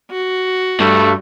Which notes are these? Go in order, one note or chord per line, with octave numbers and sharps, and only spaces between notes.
F#4
G2 A3